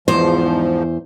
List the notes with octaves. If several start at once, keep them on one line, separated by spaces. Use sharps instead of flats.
E2 G#2 F3 C5